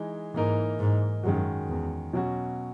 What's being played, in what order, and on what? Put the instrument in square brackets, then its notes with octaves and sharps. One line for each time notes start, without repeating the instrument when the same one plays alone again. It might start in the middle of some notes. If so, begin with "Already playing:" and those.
Already playing: [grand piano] E3 G#3 D#4
[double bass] G#2 [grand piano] E3 A#3 D#4 A#4
[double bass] G#2
[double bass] F#2 [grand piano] D#3 G#3 C#4 F#4
[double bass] E2
[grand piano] B2 F#3 C#4 F#4